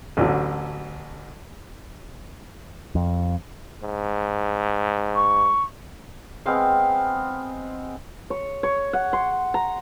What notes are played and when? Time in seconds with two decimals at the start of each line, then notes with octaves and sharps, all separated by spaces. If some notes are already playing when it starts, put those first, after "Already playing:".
0.17 A1 D2 D3 F#3
2.95 F2
3.83 G#2
5.15 C#6
6.46 G#3 B3 C4 F5
8.30 C#5
8.63 C#5
8.93 F#5
9.13 C6
9.54 A#5